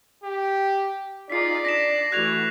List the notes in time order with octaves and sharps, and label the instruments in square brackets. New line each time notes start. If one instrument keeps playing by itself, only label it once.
[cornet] G4
[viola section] D#4 F4 G#4 [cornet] D5 [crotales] B6 C7
[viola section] D4 [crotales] A#6 B6 E7
[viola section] E3 A3 F#4 [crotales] F#6 G#6 F7